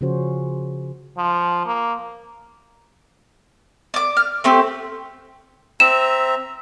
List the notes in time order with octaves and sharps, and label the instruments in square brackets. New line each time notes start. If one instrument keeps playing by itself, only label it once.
[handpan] C#3 F3 C#4 F#4 C5
[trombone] F3
A#3
[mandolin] D5 D6
F6
A3 C4 G4
[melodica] C4 E5 A#5 [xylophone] E7